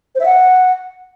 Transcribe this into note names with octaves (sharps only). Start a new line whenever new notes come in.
C5
E5
F#5